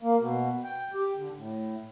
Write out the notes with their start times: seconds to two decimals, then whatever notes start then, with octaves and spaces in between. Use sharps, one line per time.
0.02 A#3
0.19 B2
0.65 G5
0.94 G4
1.16 D3
1.36 A2